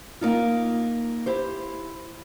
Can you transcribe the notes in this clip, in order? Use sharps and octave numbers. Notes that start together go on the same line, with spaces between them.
A#3 D#4 F4
E4 G4 C5